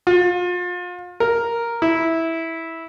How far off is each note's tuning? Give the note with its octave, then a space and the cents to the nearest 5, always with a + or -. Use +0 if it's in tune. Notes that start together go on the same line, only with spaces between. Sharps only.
F4 +35
A#4 +0
E4 -10